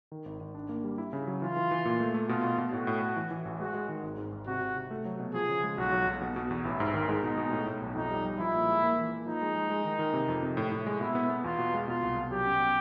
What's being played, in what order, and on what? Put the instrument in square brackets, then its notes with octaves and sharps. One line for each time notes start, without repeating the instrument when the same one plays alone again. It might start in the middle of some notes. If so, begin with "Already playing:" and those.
[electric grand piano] D#3
G#1
G#1
D4
A#3
G3
E4
C#3
F#3
[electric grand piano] E3 [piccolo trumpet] F4
[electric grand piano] E3
E3
A#2
A3
A3
[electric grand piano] B2 [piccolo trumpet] F4
[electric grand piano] B2
B2
[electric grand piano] A2 [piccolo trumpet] F#4
[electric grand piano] A2
A2
E3
E3
A1
[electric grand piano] G#3 [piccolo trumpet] F#4
[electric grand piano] G#3
D#3
G#1
G#2
G#1
[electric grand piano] C3 [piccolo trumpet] F#4
[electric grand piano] C3
C3
A3
F#3
B2
[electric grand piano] F3 [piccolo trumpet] G#4
[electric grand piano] C#3
G#3
[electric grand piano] B1 [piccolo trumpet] F#4
[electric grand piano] F#3
B1
B2
B2
E2
[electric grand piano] A1 [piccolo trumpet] E4
[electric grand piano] G#2
D#3
[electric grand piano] G#3 [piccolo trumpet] D#4
[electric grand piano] B2
B2
A2
A2
B1
[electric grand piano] F2 [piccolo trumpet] D#4
[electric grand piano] G3
G3
[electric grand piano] F3 [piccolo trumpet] E4
[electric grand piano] A#2
G#3
A#3
E3
A#3
[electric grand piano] F3 [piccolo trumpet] D#4
[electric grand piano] G#3
G#3
G#3
D#3
D#3
C3
F2
C3
A2
A2
G#3
[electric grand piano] B2 [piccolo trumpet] E4
[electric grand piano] B3
B3
[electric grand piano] E2 [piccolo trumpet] F4
[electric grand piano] B2
G#3
[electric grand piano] B2 [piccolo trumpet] F4
[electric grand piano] C2
B2
[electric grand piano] F#3 [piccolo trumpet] G4
[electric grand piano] C#4
B2